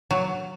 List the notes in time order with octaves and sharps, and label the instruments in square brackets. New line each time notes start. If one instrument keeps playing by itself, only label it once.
[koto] F#3